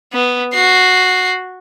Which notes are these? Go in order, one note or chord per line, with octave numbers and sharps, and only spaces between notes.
B3
F#4 C7